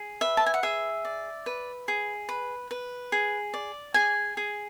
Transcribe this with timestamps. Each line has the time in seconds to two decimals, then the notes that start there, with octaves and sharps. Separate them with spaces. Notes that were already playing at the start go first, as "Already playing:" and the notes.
Already playing: G#4
0.21 B4 E5
0.37 A5
0.46 G#5
0.54 F#5
0.63 G#4 E5
1.05 D5
1.46 B4
1.88 G#4
2.29 B4
2.71 B4
3.12 G#4
3.54 D5
3.94 G#4 G#5
4.37 G#4